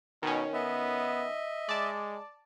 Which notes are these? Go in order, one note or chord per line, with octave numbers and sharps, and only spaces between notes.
B2 D#3 C#4
B3 D#5 E5
G#3 D5 A5